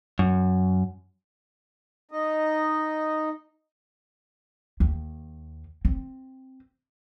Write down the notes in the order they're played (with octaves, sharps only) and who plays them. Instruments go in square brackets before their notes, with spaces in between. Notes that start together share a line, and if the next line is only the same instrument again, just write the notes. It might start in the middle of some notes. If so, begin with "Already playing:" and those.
[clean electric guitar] F#2
[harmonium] D#4 D#5
[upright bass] D#2
C4